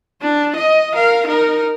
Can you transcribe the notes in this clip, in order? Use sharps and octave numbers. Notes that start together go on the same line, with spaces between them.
D4
D#5
A#4 F5
D#4 A#4